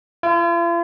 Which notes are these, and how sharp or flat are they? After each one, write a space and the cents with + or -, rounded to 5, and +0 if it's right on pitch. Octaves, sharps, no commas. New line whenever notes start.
F4 -45